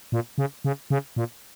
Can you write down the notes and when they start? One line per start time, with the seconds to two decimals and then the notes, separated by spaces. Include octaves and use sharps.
0.12 A#2
0.38 C#3
0.65 C#3
0.90 C#3
1.16 A#2